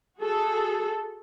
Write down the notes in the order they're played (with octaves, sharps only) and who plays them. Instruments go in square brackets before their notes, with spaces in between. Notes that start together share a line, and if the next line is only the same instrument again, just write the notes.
[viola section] F#4 G#4 A4